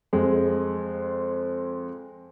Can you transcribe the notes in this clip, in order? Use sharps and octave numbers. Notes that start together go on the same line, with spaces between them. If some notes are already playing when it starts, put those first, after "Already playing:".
F2 G#3